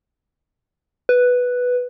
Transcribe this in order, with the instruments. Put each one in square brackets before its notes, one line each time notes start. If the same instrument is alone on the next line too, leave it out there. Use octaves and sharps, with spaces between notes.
[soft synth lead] B4